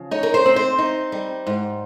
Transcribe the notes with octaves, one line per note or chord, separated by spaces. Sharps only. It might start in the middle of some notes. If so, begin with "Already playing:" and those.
Already playing: C#3 F3
D#4 C#5
A#4
C5
C4
C5
D#4
G3
G#2